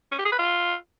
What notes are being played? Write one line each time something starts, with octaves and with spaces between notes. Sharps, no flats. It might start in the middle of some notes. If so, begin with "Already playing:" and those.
C#4
G4
G#4
B4
F4